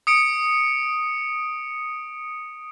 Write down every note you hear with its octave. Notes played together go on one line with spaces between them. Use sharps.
D#6 C#7 D7